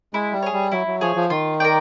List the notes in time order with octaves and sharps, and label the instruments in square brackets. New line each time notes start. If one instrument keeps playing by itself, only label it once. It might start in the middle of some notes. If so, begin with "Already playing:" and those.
[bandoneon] G#3 [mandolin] E4
[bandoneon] G3
[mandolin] G#4 C#5
[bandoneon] G3
[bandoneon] F#3 [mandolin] E4
[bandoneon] F#3
[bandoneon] F3 [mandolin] G#4 C#5
[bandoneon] F3
[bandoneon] D#3 [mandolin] F4
[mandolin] A#4 D5 G5